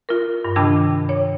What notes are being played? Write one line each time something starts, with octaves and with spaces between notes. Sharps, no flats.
F4 A#4
G2
C3 D#3 D4 G5 A5 G#6
C#5